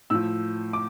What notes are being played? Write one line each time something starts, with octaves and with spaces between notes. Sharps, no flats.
A2 F3 E6
D6